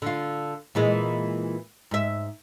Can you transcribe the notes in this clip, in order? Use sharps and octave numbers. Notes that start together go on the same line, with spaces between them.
D3 F4
A#2 E3 G#3
G#2 E5